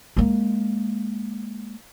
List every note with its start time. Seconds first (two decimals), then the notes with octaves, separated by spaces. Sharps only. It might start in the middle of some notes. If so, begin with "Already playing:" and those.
0.17 G#3 A#3